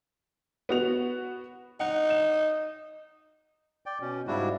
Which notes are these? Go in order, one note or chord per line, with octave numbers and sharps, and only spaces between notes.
B3 F#4 F7
D#4 F#5
E7
D5 G5
B2 C#4
G#2 C#3 G3 D4 E4 F#4